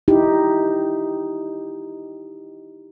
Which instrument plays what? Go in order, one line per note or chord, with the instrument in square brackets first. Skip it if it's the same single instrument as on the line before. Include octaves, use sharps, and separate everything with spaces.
[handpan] D#4 E4 G4